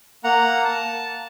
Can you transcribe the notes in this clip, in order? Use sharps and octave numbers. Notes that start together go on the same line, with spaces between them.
A#3 F#5 A#5
A5